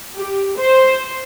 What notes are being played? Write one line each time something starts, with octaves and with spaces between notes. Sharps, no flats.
G4
C5